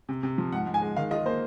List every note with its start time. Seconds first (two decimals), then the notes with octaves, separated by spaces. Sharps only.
0.09 C3
0.23 C3
0.38 F3
0.52 G#2 F#5
0.67 G#2
0.74 G#5
0.82 G#3
0.97 D#3 F5
1.11 F4 D#5
1.26 A#3 C5